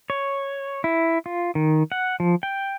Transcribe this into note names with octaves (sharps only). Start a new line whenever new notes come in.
C#5
E4
F4
D#3
F#5
F3
G5